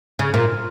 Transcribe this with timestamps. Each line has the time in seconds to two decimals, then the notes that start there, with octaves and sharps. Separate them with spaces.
0.19 C#3
0.34 A#2